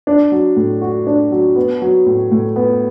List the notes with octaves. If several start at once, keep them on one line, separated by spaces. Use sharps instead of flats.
D4
F#3
A2
F#4
D4
F#3
B3
F#3
A2
A2
B3